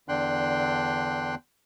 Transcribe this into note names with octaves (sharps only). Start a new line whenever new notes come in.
E2 D3 D4 G5 C6 F#6